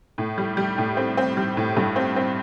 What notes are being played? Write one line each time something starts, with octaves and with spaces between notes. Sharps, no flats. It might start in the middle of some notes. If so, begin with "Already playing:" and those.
A2
G3
G3
A2
C4
C4
G3
A2
G2
C4
C4